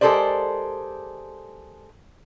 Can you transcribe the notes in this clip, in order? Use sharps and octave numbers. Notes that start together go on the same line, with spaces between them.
G#3 G4 A4 A#4 C5 D5